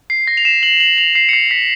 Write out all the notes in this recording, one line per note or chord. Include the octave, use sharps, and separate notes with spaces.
C7
A#6
F7
E7
F#7
F#7
F7
C7
C#7
C7
B6